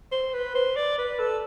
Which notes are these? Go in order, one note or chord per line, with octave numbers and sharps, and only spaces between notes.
C5
B4
C5
D5
B4
A4